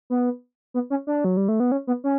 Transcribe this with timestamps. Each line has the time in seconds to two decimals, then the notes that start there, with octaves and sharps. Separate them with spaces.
0.10 B3
0.74 B3
0.90 C#4
1.07 D4
1.24 F#3
1.37 G3
1.48 A3
1.60 B3
1.72 C#4
1.87 B3
2.04 C#4